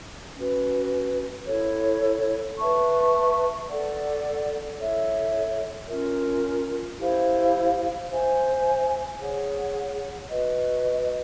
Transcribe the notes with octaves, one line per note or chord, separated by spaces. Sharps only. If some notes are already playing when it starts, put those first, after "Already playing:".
C#4 F#4 B4
E4 A4 C#5
B4 E5 A5 C#6
A4 D5 F#5
E4 A4 C#5 E5
C#4 F4 A#4
E4 G4 C5 F5
C5 E5 G#5
G#4 C#5 F#5
F#4 B4 D#5